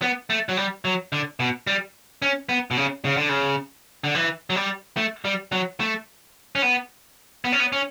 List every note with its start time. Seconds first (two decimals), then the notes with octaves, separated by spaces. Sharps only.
0.02 B3
0.30 A3
0.49 F#3
0.57 G3
0.85 F#3
1.12 D3
1.40 B2
1.67 G3
2.22 C#4
2.49 B3
2.71 B2
2.77 C#3
3.05 C#3
3.17 D3
3.29 C#3
4.04 D3
4.15 E3
4.50 F#3
4.56 G3
4.97 A3
5.25 G3
5.52 F#3
5.80 A3
6.55 C#4
6.62 B3
7.45 B3
7.52 C#4
7.60 B3
7.72 C#4